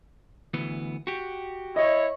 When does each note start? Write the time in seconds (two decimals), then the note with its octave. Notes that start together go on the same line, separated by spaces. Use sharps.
0.54 D2 E3 B3
1.07 F#4 G4
1.76 E4 C#5 D#5